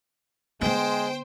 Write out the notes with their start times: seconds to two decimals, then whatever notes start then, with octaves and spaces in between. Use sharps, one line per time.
0.61 D3 G#3 B3 C5 G5